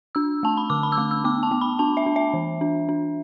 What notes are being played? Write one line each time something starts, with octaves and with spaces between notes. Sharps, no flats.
D4 E6
A3 A5
B5
D3 D6
B5
E6
A3 D6
E6
B3 D6
A5
B3
B5
D4 A5
E5
D4
E5
E3
D4
D4